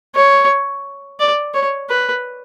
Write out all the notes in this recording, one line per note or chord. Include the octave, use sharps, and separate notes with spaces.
C#5
D5
C#5
B4